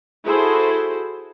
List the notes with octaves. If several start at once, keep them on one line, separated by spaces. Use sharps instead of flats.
E4 F#4 G#4 A4 C5